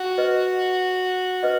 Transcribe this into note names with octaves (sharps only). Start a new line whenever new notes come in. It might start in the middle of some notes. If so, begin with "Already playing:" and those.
Already playing: F#4
B4 D#5
B4 D#5